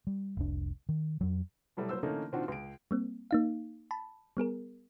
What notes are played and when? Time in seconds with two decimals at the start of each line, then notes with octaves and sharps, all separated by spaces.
0.07 G3
0.37 F1 C2 D4
0.89 D#3
1.21 F2 F#3
1.77 B2 F#3 G3 A3 E4
1.89 F#3 A#3 C5 E6
2.03 D3 E3 A3 A#3 C#4 D#4
2.32 A#2 D#3 C4 D4 F4 F#4
2.48 C#2 D7
2.91 G3 A#3 C4
3.31 A#3 D#4 F5
3.91 A5 B5
4.37 G3 B3 G#4 A#4